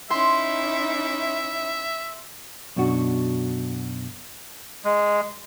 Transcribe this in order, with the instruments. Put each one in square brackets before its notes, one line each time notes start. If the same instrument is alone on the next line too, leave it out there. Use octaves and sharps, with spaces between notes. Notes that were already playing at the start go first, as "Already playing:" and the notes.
[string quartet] C#4 D#4 E4 [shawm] E5 [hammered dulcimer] C6
[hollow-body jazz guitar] F#2 B2 D4 F#4
[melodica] G#3